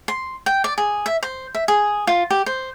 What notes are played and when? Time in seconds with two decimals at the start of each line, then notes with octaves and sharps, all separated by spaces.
0.08 C6
0.46 G5
0.64 D5
0.78 G#4
1.06 E5
1.23 C5
1.55 E5
1.68 G#4
2.07 F4
2.30 G4
2.46 C5